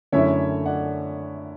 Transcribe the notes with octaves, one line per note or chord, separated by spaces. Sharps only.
F#2 D3 A3 C#4 E4 C#5 E5
D5 F#5